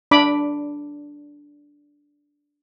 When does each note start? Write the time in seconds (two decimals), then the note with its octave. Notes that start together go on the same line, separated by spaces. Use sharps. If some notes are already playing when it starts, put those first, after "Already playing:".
0.11 D4 B5 D6